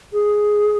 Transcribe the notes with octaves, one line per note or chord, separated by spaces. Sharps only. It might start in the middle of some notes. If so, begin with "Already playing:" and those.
G#4